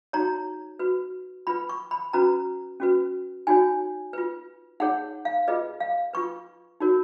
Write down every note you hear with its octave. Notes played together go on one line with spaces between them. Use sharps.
D#4 F#4 C#5 A#5
F#4 B4
F4 B4 B5
C#6
B5
C#4 F#4 B4 A#5
C#4 F#4 B4
D#4 F#4 C#5 G#5
F4 B4
D#4 G#4 C#5 F#5
F5
F4 G#4 B4 D#5
F5
F4 B4 C#6
D#4 F#4 A#4 C#5